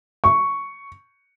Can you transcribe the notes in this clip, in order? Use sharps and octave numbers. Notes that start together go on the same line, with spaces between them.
C#6